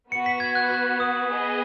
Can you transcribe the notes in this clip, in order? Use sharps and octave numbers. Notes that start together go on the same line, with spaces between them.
B3 F#4 B4 C#7
B6
G#6
F#6
F#6
D#6
B3 G#4 D#5